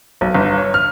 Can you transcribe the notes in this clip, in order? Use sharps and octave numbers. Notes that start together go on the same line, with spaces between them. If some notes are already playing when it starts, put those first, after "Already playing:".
B1
G1
C#5
F6